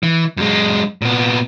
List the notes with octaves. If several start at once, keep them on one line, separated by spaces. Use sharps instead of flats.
E3
F#2 G#3
A#2 B3